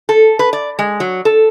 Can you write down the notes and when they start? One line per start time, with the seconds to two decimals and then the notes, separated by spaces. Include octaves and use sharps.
0.09 A4
0.39 B4
0.53 D5
0.79 G#3
1.00 F#3
1.25 A4